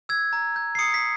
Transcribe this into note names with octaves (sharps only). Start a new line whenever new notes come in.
E6 G#6
A#5
G6
C7
D#6 C#7
B6